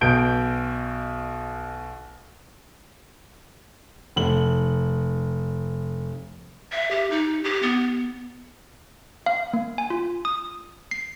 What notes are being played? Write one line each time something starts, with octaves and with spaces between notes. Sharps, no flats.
B1 B2 G6 D7
F1 F#7
E5
G4
D#4
G4
B3
F5
A#3
G#5
F4
D#6
C7